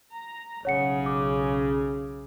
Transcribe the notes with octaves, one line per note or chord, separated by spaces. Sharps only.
A#5
B1 C#3 C#5 F#5 C#7
D6